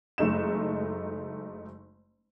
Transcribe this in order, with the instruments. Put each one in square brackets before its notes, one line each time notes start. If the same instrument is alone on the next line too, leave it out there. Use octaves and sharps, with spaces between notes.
[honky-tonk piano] F#1 G#3 A3 D#4 E7